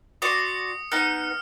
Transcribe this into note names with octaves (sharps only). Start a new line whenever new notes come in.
F#4 D5 C6 D#6 C#7
B3 D#4 F#5 F6 C#7